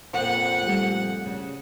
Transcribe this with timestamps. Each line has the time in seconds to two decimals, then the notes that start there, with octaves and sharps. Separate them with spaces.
0.14 F2 A#2 F3 F#5
0.63 G3 A3
1.26 C#3